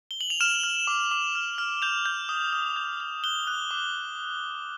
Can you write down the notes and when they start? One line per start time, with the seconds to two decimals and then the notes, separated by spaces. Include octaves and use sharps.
0.11 G7
0.21 F#7
0.30 F7
0.40 F6 E7
0.63 F6
0.87 D6
1.11 D6
1.35 F6
1.58 F6
1.82 G6 F7
2.06 G6
2.29 D#6
2.53 D#6
2.76 G6
3.00 G6
3.24 F#6 G7
3.47 F#6
3.71 D6